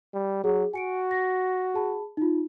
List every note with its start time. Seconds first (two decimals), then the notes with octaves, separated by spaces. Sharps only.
0.14 G3
0.44 F#3 G#4
0.73 F#4 G#5 C#7 D7
1.11 A#6
1.74 G#4 A5 B5
2.17 D#4 F4